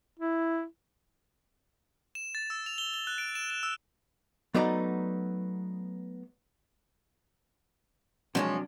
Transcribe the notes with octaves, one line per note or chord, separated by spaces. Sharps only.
E4
E7
A6
E6
F7
G7
G7
F#6
D7
E7
E7
E6
F#3 A3 B3 D#4 D5 A#5
C3 F3 F#3 G#3 C#4 D4